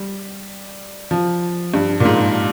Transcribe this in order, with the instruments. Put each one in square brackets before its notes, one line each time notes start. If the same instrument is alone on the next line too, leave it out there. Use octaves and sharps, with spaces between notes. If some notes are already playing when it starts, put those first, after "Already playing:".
Already playing: [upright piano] G3
F3
G2
A#2
G#2